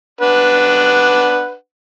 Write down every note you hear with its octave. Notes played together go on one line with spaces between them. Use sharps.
D4 B4 F#5